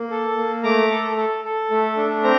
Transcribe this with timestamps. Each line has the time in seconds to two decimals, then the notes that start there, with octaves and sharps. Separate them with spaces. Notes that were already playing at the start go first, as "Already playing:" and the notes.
Already playing: A#3
0.10 A4
0.37 A#3
0.63 A3 A#5 D6
0.90 A4
1.17 A4
1.45 A4
1.71 A3
1.97 D4
2.23 C4 A#5